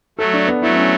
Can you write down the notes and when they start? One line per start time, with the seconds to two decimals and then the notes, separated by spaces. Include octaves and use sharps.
0.18 F#3 A3 A4
0.33 D4
0.47 B3
0.62 F#3 A3 E4
0.76 C#4